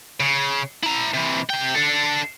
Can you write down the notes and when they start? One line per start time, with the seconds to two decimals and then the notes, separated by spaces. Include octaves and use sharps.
0.20 C#3
0.83 E4 A#5
1.14 C3 E3
1.49 C3 G5
1.75 D4 A4